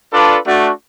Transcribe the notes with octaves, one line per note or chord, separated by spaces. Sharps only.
D4 F4 A4 B4 D5
A3 D4 F#4